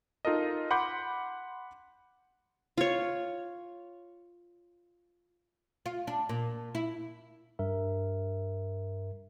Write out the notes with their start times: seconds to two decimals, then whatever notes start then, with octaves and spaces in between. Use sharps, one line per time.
0.25 D#4 F4 A4 A#4 D#5
0.71 F#5 B5 C6 D6 G6
2.78 F4 C#5
5.86 F4
6.07 D4
6.29 A#2
6.75 E4
7.59 G2 A#4 E5